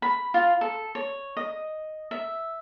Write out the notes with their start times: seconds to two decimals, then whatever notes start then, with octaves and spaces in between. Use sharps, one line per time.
0.02 B5
0.34 F4
0.61 A4
0.95 C#5
1.37 D#5
2.11 E5